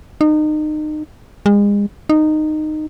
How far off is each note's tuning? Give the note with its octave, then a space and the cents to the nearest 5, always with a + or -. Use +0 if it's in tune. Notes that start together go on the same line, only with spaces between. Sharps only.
D#4 -30
G#3 -35
D#4 -15